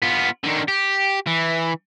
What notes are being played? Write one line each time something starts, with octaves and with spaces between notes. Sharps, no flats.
B3 F4
D3 D#3
G4
E3